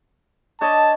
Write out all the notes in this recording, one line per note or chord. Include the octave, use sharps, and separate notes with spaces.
D4 C#5 D#5 A5